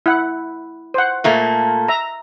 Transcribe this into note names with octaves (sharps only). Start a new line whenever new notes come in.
E4 F#5
C5 F#5
A#2 A3 A#3
E5 A#5